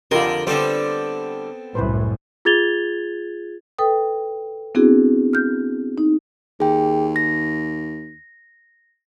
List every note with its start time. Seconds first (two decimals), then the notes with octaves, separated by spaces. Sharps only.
0.11 F2 D3 F4 G4 A#4 C6
0.47 D3 G3 B3 C4 A4 C5
1.75 C2 F#2 A2 E4 B4 C5
2.45 F4 G#4 G#6 A6 F7 G7
3.78 A4 B4 G5 D#6
4.75 B3 C4 D4 E4 F#4 G#4
5.33 F6 G6
5.98 D#4
6.60 D#2 G#4 G5
7.16 A#6